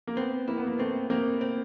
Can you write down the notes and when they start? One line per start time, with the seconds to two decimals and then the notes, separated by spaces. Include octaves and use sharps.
0.07 A#3
0.17 B3 C4
0.48 A#3 E4
0.57 B3
0.67 A#3
0.79 A3 C4
1.10 A#3 C4
1.41 C4